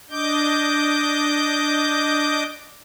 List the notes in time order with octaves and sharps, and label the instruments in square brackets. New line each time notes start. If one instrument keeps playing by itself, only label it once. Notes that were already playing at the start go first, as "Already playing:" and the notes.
[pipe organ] D4 D#5 D6 G6